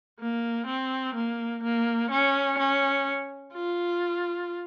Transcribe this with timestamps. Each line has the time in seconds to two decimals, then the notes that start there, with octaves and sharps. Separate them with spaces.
0.20 A#3
0.67 C4
1.15 A#3
1.63 A#3
2.11 C#4
2.58 C#4
3.53 F4